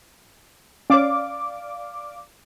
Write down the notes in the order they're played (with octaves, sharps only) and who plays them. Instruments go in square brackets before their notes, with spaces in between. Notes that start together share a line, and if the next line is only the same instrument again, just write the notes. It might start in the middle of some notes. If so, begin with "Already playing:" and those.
[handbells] C#4 C#5 [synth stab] D5 F5 D6